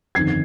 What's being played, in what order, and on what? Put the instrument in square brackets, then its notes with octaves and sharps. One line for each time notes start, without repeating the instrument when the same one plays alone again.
[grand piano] G1 F2 D#3 G#6 C7